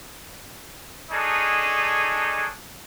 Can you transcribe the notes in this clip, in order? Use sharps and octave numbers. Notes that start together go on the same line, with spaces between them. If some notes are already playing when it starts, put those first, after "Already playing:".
D4 D#4 G#4 A4 C#5